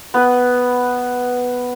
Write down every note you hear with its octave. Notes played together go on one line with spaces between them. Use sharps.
B3 B4